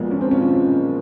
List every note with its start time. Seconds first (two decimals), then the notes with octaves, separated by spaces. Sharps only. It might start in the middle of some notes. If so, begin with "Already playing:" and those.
Already playing: B1 A#2 F3 G#3 A#3 B3
0.11 C#4
0.21 C4
0.31 C#4
0.42 C#4